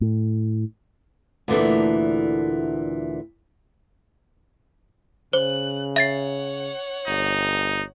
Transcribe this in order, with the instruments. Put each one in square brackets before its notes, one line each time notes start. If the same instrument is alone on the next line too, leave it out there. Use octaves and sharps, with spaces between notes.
[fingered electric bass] A2
[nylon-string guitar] D2 A#2 E3 A3 D4
[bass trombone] C#3 [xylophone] C5 [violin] F#6
[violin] C#5 F#5 [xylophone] E5 A6 C7
[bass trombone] G1 [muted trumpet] D#4